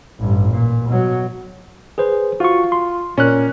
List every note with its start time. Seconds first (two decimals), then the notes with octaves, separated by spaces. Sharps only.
0.20 A1 G2
0.50 A#2
0.89 B2 F#3
1.98 G#4 B4 C5
2.40 F4 F#4 C#6
2.72 C6
3.18 A#2 C#4 A#4 D5 F#6